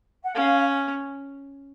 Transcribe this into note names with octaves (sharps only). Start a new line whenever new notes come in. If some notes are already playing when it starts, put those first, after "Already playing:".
F#5
C#4 F5